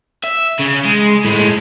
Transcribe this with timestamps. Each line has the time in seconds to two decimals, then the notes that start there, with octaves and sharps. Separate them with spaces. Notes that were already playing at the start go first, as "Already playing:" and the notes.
0.24 E5
0.59 C#3
0.85 G#3
1.25 A2 G#3